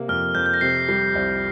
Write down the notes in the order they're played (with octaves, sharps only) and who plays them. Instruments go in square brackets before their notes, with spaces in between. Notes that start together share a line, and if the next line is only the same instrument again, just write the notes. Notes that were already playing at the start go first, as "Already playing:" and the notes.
Already playing: [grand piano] C3 A#3
[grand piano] F2 [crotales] F6
[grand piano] F2 [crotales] G6
[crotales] G6
A#6
[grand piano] C3 [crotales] C7
[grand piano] G3 [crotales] C7
[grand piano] C2